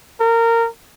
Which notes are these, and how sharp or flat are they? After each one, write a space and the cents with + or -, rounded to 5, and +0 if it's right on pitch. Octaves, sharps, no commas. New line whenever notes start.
A#4 -20